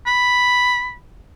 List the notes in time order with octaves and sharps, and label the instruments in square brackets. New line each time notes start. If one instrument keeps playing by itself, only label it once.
[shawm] B5